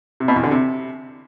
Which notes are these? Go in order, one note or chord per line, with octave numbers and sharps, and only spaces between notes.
C3
B2
E2
D3
C3